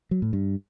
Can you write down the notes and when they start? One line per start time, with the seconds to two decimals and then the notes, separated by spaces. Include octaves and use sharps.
0.11 F#3
0.22 A2
0.33 G2